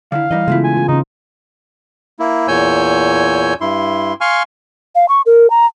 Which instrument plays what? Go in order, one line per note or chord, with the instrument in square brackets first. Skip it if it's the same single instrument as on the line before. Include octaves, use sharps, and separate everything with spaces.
[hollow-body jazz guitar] D3 D#3 E4 [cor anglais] F5
[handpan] E3 [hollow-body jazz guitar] G3 D#4 D#5
[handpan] C#3 B3 F4 [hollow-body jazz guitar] G#3 A3 E4
[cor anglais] G#5
[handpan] F4
[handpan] C#3 C#4 [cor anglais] D#4
[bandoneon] A#3 E4
E2 A#2 C#5 G#5 E6 G6
G2 E4 C6
F5 G#5 C6 C#6 F6
[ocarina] F5
C#6
A#4
A#5